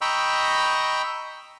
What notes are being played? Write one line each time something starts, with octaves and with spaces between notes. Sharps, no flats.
D#5 G5 A#5 B5 C#6 E6